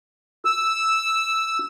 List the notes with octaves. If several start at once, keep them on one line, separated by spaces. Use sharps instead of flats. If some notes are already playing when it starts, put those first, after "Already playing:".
E6